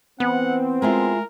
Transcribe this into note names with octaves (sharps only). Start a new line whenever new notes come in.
E3 B3 C4 F#5
G#3 E4 F4 A#4